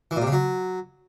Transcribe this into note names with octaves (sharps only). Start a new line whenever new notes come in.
E3
A#2
C3
C#3
F#3